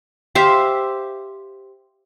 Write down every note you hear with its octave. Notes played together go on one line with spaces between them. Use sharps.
G4 C5 E5 F5